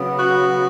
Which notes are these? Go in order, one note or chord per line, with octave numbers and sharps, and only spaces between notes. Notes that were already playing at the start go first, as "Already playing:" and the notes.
Already playing: C#3 F#3 B3
F#4